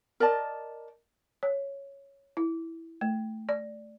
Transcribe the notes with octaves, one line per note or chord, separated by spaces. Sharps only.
A#4 D5 D#5 A5
C#5
E4
A3
D5